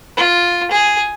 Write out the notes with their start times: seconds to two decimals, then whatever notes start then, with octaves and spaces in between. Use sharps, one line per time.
0.17 F4
0.71 G#4